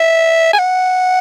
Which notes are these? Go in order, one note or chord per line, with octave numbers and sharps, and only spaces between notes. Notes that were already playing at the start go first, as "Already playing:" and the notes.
Already playing: E5
G#5
F#5